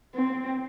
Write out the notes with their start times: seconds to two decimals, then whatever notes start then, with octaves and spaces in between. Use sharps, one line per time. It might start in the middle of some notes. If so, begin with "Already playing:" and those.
0.15 C4